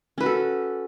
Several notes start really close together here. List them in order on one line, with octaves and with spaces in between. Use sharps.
C#4 B4 F#4 A4